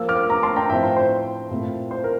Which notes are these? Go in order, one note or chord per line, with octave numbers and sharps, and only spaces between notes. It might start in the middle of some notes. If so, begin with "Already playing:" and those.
Already playing: F3 A#3 F4 E6
D6 F6
A#5 D6
A5 C6
G5 A#5
A2 F3 C4 F4 E5 G5
C5
C5
A#2 A3 C4 E4
C5
A#4